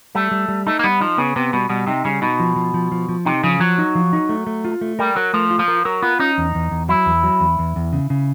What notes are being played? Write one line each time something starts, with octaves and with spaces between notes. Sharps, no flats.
G3 A3
G3
G3
A3 D#4
A#3
G3 B3
F3 D#4
C#3 B3
C3 B3
B2 G3
B2 G3
C3 D#4
C#3 G3
B2 D#4
F3
F3
F3
F3
F3
C3 D#4
C#3 F3
F3 F#3
D#4
F3
D#4
A3
A3
F4
A3
G3 A#4
F#3 A#4
F3 A3
F4
F3
A#4
F#3 A#4
B3 F4
C#4 D#4
E2
E2
E2
F#3 E4
E2
F#3
E2
E2
E2
C#3
C#3